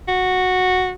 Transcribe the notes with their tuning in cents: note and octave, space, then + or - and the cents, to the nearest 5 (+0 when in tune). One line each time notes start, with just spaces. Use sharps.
F#4 -5